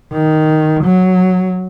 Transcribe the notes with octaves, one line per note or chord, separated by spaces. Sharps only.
D#3
F#3